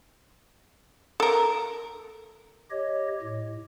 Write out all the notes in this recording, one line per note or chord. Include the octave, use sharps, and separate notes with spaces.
A4 A#4
G4 C#5 D#5
A2